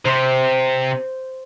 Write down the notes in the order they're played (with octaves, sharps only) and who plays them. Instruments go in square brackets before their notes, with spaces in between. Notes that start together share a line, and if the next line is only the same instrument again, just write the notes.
[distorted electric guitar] C3 [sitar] C5